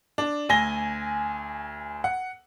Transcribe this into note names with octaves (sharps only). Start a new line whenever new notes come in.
D4
D2 G#5 A#6 G7
F#5